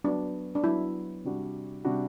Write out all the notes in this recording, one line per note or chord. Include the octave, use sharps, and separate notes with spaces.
F#3 B3 D4 F#4
D4
F#3 B3 E4 F#4
C3 G3 D4 F#4
C3 G3 D4 F#4